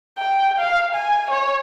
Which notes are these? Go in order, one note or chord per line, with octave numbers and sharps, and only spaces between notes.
G5
F5
G#5
C#5